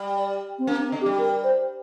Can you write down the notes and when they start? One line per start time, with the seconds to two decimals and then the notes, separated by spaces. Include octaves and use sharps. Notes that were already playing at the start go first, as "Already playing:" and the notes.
Already playing: G3
0.17 D5
0.59 C4
0.67 A#3 D4
0.85 C4
0.92 D3
1.01 G4
1.06 G3
1.18 A#4
1.43 C5